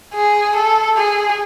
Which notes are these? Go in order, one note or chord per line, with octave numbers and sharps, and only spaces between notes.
G#4
A4
G#4